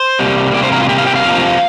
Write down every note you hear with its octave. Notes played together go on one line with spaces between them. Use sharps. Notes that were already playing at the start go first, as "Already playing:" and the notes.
Already playing: C5
C3 G3 A#3
C3 G3 A#3 D5
C5
A#4
F4
C3 G3 A#3 G4
F5
G5
F5
F2 C3 F3 A#3